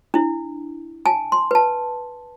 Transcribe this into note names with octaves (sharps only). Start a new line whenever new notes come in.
D4 E4
G#5 A5
C6
B4 A5